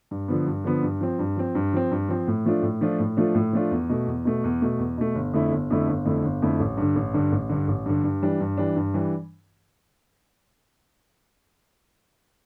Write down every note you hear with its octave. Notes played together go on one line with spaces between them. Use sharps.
G2
D3 F3 B3
G2
D3 F3 B3
G2
F3 C4
G2
F3 C4
G2
F3 C4
G2
F3 C4
A2
F3 A3 D4 F4
A2
F3 A3 D4 F4
A2
F3 A3 D4 F4
A2
F3 A3 D4 F4
E2
B2 A3
E2
B2 A3
E2
B2 A3
E2
B2 A3
G1
F2 D3 A3 E4
G1
F2 D3 A3 E4
G1
F2 D3 A3 E4
G1
F2 D3 A3 E4
A1
G2 D3
A1
G2 D3
A1
G2 D3
A1
G2 D3
G2
E3 G3 D4
G2
E3 G3 D4
G2
E3 G3 D4